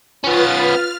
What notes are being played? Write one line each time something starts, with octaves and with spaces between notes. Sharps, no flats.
B3 C#4 F4 B4 A6
F6